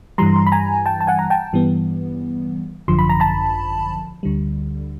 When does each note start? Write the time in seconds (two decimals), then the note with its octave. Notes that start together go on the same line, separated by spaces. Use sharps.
0.18 G2 E3 G3 A#5 C6
0.46 B5
0.52 G#5 A#5
0.86 G5 A5
1.01 A5
1.07 F#5 G#5
1.19 A#5
1.30 G5 A5
1.53 G2 E3 G3 B3
2.88 G#1 F#2 D3 F3 C6
2.99 B5
3.10 A#5
3.20 A5 B5
4.23 D2 D3 G3